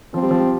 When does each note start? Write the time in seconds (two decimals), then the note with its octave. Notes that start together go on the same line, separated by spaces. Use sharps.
0.14 F3 C4
0.22 G3
0.31 F3
0.40 G3